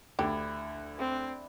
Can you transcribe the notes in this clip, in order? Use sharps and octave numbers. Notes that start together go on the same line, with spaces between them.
D2 D4 E4 G4
C4